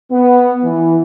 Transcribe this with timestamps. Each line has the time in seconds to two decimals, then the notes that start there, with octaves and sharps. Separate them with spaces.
0.11 B3
0.63 E3